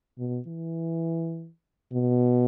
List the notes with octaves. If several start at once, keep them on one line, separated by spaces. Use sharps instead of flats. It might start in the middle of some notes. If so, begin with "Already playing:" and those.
B2
E3
B2